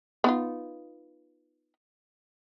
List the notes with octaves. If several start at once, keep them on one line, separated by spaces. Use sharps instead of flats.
B3 D#4 F4